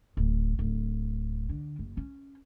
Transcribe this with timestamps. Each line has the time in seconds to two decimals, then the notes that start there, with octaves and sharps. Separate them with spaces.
0.17 D1
0.59 D1
1.49 D3
1.79 F#1
1.97 C#4